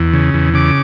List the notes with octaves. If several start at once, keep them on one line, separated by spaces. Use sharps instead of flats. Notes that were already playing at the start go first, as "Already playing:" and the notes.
Already playing: E2
C#3
E2
C#3 D6